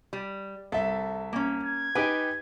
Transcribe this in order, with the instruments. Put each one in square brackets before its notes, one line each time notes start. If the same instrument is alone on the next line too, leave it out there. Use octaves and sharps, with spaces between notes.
[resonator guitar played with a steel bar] G3
[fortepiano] C2 E5 [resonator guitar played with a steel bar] A4
[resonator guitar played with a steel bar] A#3 C#4
[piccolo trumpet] G#6
[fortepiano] D#4 G4 B4 [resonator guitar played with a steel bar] G5 G#5